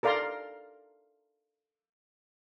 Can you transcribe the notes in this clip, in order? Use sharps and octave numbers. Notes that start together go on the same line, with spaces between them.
A4 A#4 D5 F5 A#5 C6